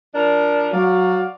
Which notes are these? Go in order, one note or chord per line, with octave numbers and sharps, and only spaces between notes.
F3 D4 A#4
F#3 F#4 D5 F5